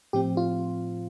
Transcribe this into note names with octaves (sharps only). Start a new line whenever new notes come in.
A2 F3 C4 G4
F4